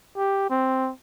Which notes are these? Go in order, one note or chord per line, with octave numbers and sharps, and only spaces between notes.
G4
C4